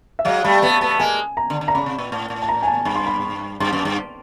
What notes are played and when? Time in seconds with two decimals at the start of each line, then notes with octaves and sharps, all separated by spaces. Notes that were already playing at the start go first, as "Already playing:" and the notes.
0.19 E5
0.25 F#3 G#3 F5
0.44 G3 A3 B5
0.62 A3 B3 B5
0.81 A3 B3 A5
0.99 G#3 A#3 G#5
1.37 A#5
1.50 D3
1.61 D3
1.68 A#5
1.74 C#3 B5
1.86 C3
1.98 A#2
2.12 A2
2.30 A2
2.42 A5
2.49 A#5
2.63 G#5
2.67 A5
2.85 G2 B5
2.96 C6
3.06 B5
3.60 G2 C6
3.73 F#2
3.85 G2